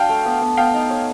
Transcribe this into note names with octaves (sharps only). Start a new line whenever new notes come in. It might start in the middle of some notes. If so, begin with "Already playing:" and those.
Already playing: D4 F#4 F5 G5
A3
B3
B3
B3 F5 G5
D#4
C#5